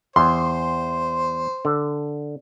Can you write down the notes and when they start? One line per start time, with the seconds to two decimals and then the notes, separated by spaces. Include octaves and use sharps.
0.16 E2 C5 C6
1.65 D3